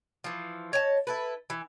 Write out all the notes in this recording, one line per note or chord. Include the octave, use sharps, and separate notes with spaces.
E3 F3
C#5 D#5 G#5 A5
E4 A4 B4
E3